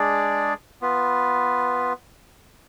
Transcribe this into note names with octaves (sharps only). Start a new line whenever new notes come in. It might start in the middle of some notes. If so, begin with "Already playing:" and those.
Already playing: G#3 D4 G#4 D5
B3 F4 B4